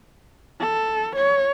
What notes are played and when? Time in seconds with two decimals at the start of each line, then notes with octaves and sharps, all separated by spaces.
0.60 A4
1.16 C#5